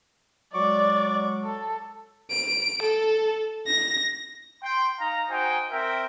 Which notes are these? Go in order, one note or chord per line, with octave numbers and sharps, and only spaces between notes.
F#3 G#3 D5 C#6 D6
A4
D7
A4
A#6
G5 C6
D#4 F5 A#5
D#4 F#4 C5 G5 G#5
C4 A#4 E5 G5